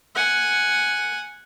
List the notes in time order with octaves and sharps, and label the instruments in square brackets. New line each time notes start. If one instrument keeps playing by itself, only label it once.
[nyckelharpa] F#5 G#5